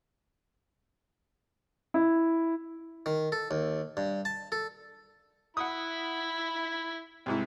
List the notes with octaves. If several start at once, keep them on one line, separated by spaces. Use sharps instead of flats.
E4
D#3
A4
D#2
G2
A5
A4
E4 F#5 B5 D#6
C2 G#2 E4